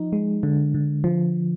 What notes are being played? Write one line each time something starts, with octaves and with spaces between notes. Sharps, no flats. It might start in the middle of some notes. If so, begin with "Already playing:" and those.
Already playing: F3 D#4
G#3
D3
D3
F3